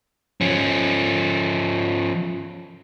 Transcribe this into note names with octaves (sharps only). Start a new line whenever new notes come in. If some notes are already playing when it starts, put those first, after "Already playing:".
F3 C#4